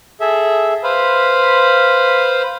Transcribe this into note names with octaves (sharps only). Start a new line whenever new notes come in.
G#4 A4 E5
B4 C5 F5 B5